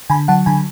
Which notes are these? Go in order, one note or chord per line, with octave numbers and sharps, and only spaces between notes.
D3 G#5 B5
F#3 F#5 A5
D3 G#5 B5